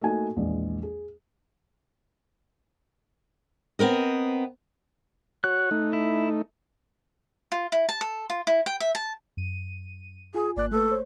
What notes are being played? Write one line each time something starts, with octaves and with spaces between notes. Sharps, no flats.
A3 A#3 D#4 F#4 G#5
A#1 E2 G#3
G#4
B3 C4 A#4 D#5
F#4 C#5 F#6
A3 D#4
E4
F4
E4
A5
A4
F4
E4
G5
E5
A5
F#2 D#7
F4 G#4 G#5
G#1 A#3 D5 F#6
A3 A4 B4
C5 C#5